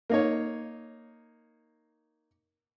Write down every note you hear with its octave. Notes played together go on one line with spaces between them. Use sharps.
A#3 D#4 C#5